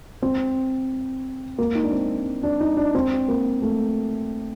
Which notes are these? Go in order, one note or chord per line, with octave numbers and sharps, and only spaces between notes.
C4
A#3
D#4
D4
C4
D4
D#4
D4
C4
A#3
A3